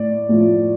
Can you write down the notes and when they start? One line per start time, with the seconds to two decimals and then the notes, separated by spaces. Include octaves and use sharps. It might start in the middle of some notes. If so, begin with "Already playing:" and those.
Already playing: A2 D5
0.29 A2 F3